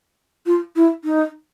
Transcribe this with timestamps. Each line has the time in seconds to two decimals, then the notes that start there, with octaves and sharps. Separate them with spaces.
0.46 F4
0.76 E4
1.05 D#4